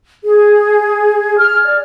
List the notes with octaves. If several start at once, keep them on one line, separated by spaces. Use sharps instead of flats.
G#4
F6
D5